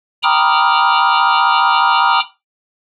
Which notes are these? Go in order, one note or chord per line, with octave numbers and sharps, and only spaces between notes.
G5 A#5 B5 D6 D#6 F6